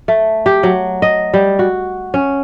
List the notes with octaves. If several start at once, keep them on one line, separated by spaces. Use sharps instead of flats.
A3
G4
F#3
D#5
G3
F#4
C#4